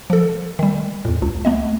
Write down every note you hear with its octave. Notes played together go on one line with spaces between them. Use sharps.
F3 A4
D#3 G3
E2 A2
C#2
A3 B3 D#5